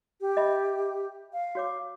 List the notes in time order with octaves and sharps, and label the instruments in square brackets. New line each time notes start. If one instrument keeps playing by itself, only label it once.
[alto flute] G4
[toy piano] D#5 E5 B5
[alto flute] F5
[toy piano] F#4 C#5 D6